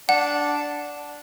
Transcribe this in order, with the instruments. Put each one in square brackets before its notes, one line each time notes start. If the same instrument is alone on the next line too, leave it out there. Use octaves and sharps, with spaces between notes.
[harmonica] D4 [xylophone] F#5